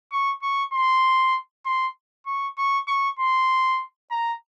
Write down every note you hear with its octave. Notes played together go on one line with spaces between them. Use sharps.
C#6
C#6
C6
C6
C#6
C#6
C#6
C6
A#5